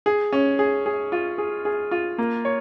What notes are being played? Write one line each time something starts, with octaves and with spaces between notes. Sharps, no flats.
G#4
C#4
G#4
G#4
F4
G#4
G#4
F4
A#3
C#5